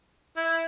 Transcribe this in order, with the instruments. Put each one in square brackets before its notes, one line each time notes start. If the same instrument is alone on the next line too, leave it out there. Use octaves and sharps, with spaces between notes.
[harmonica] E4